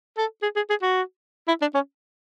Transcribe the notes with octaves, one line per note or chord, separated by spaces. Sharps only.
A4
G#4
G#4
G#4
F#4
E4
D4
C#4